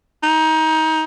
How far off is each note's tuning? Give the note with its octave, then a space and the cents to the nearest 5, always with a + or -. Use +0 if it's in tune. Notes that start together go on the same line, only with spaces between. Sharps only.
D#4 +25